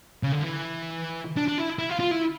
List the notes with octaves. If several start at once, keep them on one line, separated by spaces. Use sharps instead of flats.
C#3
D3
E3
D4
D4
E4
E4
F4
F4
E4